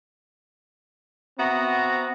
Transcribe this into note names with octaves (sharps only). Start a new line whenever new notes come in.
B3 C4 F#4 E5 A#5